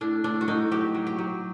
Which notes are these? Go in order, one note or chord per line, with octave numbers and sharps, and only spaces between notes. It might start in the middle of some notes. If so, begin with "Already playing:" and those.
A2 D4
A2 D4
F#4
A2 D#4
F#3 G4
F#3
G4
F#3